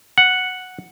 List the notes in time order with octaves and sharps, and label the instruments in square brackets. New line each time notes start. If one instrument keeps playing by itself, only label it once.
[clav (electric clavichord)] F#5